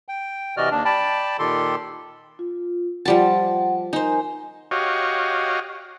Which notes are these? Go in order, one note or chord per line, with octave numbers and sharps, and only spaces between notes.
G5
C3 E3 F#4 D5 D#5 F6
D#2 D4
D5 G5 A5 B5
A#2 D#3 G4 A4 C6
F4
F3 G3 F#5 A5
D#4 A#4 C5 G#5
F#4 G4 C#5 D#5 F5